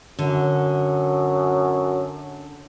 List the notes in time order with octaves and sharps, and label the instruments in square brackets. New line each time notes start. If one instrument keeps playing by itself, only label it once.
[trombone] F#2 [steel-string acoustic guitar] D3